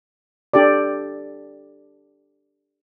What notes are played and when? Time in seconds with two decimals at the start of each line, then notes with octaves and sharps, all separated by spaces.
0.54 D4 G4 A4 D5